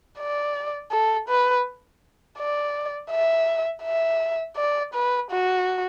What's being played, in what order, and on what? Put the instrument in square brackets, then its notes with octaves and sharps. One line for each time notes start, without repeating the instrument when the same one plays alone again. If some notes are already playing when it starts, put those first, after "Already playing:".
[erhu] D5
A4
B4
D5
E5
E5
D5
B4
F#4